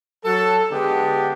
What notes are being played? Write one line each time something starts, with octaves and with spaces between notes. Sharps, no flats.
F#3 A4
D3 G#3 B3 D4 G4